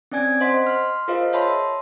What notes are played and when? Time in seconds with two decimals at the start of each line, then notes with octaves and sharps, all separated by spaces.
0.12 C4 C#4 D5 G#5 G#6
0.41 C5 D#5 F#5 C6 B6
0.67 C6 F6
1.08 F4 G#4 A#4 C5 D#5 F5
1.33 C#5 E5 A5 B5 C6